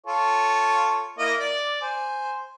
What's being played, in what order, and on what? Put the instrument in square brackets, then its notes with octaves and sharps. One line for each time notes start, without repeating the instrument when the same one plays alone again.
[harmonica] F4 A4 C#5
A#3 E4 D#5
D5
C5 G#5